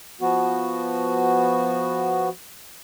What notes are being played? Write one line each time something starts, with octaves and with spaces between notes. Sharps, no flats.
F3 B3 F#4